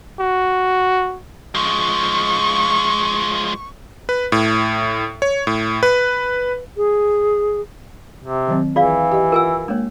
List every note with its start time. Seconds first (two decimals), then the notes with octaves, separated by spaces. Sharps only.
0.20 F#4
1.55 F3 G#3 C#6
4.09 B4
4.32 A2
5.22 C#5
5.47 A2
5.83 B4
6.77 G#4
8.23 C3
8.48 D#3 F#3 C4
8.76 E3 F4 G#4 D5 F5
9.12 G4 D#5
9.32 F4 A#4 F#5 G#5 E6
9.68 G#3 A#3 D4 C#5